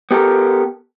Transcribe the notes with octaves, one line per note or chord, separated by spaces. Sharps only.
B3 G4 A4 A#4